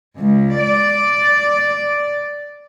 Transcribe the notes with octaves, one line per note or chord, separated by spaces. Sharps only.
C#2
D5